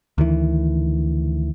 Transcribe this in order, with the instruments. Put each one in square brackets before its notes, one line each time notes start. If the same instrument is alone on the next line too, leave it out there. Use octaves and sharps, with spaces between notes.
[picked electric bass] D2 D#3 E3